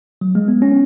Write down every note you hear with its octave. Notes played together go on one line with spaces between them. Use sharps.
F#3
G#3
B3
C#4